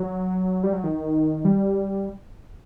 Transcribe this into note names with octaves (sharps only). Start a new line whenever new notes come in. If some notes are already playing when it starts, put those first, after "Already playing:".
Already playing: F#3
G3
F#3
D#3
G3